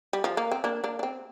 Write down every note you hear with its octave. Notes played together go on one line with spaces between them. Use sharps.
G3
F3
A#3
C4
A#3 D4
A#3 D4
D4
C4